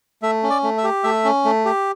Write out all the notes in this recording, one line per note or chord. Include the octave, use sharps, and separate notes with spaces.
A3 E5
C#4
D5
A3
E5
G4
A3 E5
C#4
A3
G4